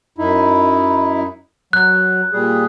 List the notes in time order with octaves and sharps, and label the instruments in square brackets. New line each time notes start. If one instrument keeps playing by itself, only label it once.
[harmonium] F#2 D#4 E4
[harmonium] F#3 [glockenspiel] F#6
[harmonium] A#2 G3 G#4